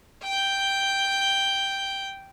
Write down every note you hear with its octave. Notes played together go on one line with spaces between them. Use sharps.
G5 G6